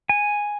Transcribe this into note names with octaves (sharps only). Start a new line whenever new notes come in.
G#5